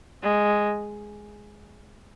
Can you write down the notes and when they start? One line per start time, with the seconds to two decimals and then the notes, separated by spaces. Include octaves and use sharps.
0.23 G#3